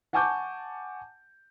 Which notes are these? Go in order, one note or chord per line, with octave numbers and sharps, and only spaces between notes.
F#5 G#5 A5 C#6 D6 G6